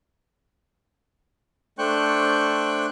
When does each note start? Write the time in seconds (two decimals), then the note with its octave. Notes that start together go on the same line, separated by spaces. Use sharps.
1.78 A3 D4 C5 G5 C#6 F#6